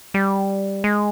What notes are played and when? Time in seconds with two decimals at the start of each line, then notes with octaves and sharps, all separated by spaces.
0.14 G3
0.84 G#3